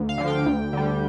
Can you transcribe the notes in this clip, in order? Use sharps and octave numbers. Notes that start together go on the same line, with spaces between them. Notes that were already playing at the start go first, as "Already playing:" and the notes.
Already playing: D2
F5
D3 F3
G5
D2
D3 G3